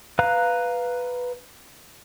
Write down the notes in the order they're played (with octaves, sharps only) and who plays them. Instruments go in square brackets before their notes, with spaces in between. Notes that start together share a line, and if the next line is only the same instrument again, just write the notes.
[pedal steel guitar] B4 F5 A#5 F#6